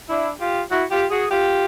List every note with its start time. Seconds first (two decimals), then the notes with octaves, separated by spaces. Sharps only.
0.09 D4 E4
0.40 F4 G4
0.70 E4 F#4
0.90 F4 G4
1.10 F#4 G#4
1.30 F4 G4